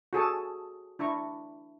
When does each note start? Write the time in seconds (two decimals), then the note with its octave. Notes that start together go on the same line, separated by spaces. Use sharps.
0.13 F#4 G#4 A4 A5
0.99 D4 E4 A#5 C#6